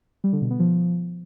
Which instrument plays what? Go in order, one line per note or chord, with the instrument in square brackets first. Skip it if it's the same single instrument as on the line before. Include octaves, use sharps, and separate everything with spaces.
[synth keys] G3
D3
B2
B3
F3